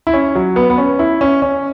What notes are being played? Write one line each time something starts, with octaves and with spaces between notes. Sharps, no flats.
E4
C#4
F#3
B3
B3
C#4
E4
C#4
C#4